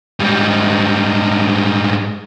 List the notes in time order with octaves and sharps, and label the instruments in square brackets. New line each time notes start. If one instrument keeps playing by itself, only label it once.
[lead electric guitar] G#2 G3